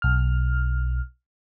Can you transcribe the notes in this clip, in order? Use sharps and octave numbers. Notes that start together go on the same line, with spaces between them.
B1 F6